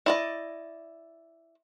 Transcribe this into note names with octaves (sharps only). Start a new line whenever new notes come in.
E4 D5 D#5